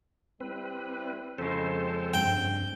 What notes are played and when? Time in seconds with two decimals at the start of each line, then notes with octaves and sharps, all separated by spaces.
0.40 G3 C4 E4 B4
1.38 F2 C#3 G#3 C4 A4 C5
2.14 G2 G5